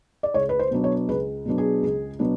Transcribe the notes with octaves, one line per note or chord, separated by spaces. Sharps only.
D5
C#2 C#5
B4
C5
B2 F#3 B3 D4
C#5
C#2 B4
B2 F#3 B3 D4
G#4
C#2
B2 F#3 B3 D4